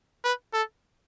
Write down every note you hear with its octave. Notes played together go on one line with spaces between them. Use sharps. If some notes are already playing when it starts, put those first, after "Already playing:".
B4
A4